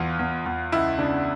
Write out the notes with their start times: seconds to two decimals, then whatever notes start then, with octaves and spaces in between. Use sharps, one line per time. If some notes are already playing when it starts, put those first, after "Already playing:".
Already playing: E2 E3 F4
0.19 E2
0.46 E2
0.72 C#2 E4
0.98 C#3 D4